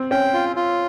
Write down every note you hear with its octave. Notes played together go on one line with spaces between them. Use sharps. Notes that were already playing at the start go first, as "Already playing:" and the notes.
Already playing: C4
C#4 G5
F4
F4